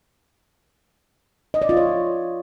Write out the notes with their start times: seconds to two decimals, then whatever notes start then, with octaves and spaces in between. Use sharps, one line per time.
1.54 D#5
1.62 D5
1.69 F4
1.77 C#5